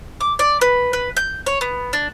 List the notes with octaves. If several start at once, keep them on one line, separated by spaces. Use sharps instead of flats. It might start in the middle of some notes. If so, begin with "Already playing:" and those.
D6
D5
B4
B4
G6
C#5
B3
D4